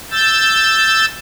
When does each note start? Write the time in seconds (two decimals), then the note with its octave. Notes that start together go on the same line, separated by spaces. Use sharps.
0.11 E6 G6 A6